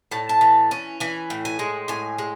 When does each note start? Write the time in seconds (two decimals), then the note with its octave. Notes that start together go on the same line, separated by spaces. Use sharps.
0.11 A2 A5
0.29 A5
0.41 E3
0.71 C#4
1.00 E3 G#5
1.30 A2
1.45 G#5
1.59 G#3
1.88 A2 G#5
2.18 G#3